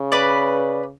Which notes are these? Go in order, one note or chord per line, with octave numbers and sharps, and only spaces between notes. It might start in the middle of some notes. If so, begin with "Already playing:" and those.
Already playing: C#3
B4 D5